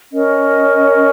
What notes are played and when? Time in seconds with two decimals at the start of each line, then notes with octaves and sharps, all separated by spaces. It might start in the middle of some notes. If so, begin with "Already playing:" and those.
0.11 C#4 A#4 D#5